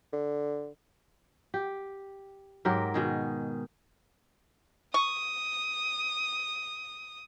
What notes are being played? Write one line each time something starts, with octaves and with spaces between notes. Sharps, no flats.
D3
G4
G#2 F#3 G4 A#4
B2 D#3 G#4
C#6 D#6